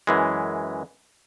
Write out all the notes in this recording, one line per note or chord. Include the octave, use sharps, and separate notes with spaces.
F#2 E3 G#3